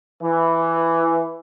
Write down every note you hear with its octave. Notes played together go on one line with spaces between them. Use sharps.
E3